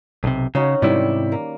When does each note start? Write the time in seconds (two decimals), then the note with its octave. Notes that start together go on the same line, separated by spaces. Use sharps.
0.24 B1 C3
0.55 C#3 C#4 D#4 F#4
0.82 G#2 C3 D#3 E3 G3 E4
1.32 A#3